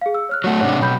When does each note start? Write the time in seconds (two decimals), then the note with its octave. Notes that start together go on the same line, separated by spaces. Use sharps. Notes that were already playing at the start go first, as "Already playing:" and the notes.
0.01 G#4 F5
0.15 E6
0.29 C#5 F6 F#6
0.44 F#3 A3 C#5 F#5
0.61 G#2 C3 D4 C#5 F#5 D6
0.81 B2 F#3 G5 B5 G6